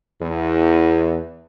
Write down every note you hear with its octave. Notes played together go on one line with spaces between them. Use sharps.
E2